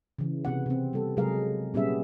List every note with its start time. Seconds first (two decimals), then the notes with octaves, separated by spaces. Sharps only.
0.19 C#3 E3
0.45 C3 B3 F#5
0.66 C3 C4
0.93 G3 B3 A4
1.17 C3 F#3 G#3 G#4 A#4 F5
1.74 A#2 G3 B3 C#4 G#4 E5